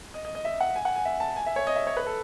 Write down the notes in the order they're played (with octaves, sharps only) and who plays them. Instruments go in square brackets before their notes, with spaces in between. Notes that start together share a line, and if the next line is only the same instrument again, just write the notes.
[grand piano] D#5
D#5
D#5
E5
F#5
G#5
F#5
G#5
E5
A5
G#5
E5
C#5
D#5
E5
C#5
B4
A4